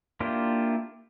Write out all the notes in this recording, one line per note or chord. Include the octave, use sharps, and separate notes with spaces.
A#3 D4 E4 F4 G4